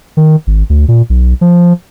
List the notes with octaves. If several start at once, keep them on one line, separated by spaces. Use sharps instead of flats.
D#3
G#1
D2
A#2
B1
F3